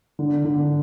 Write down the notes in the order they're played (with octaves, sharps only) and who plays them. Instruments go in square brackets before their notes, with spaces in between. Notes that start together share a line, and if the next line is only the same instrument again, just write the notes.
[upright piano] D3
D3